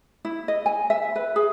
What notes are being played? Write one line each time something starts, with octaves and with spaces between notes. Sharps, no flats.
E4
D#5
G#5
E5
B4
G#4